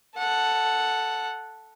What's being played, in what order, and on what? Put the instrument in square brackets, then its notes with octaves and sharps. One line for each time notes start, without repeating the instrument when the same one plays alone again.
[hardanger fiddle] A4 F#5